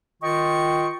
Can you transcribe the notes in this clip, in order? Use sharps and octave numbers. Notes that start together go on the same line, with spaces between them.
D#3 F4 D#5 G5 C#6